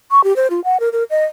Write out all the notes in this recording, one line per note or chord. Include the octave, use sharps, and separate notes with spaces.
C#6
G4
C5
F4
F#5
A#4
A#4
D#5